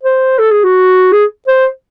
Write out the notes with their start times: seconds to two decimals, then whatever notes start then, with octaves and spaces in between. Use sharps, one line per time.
0.03 C5
0.39 A4
0.51 G#4
0.63 F#4
1.12 G#4
1.47 C5